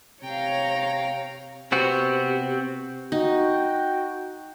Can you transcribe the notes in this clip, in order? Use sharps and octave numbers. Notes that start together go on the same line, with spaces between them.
C3 C#5 F5 G5 A#5
C3 B3 C4 F#4
D#4 F#4 G5